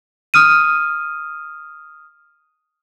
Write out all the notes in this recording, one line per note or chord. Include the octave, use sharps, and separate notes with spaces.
D#6 F6 D#7